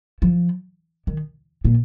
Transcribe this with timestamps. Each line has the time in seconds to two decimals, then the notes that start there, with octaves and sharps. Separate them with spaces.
0.22 F3
1.07 D#3
1.65 A#2